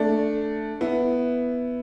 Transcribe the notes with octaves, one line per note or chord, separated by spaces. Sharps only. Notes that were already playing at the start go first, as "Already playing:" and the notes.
Already playing: A3 D4
B3 E4